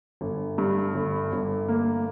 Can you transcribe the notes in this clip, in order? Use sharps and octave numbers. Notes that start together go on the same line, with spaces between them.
G1
G2
G1
G1
A#3